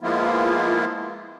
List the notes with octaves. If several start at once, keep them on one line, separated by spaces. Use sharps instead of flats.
F3 G#3 A#3 B3 E4 F4